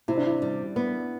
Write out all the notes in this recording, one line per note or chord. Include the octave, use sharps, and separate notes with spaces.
C3 E4
D4
E4
G3
B3